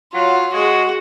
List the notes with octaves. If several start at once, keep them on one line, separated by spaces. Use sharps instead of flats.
F#3 F4
G#3 F#4